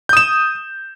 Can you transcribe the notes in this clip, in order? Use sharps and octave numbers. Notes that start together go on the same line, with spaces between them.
D#6 G6 E7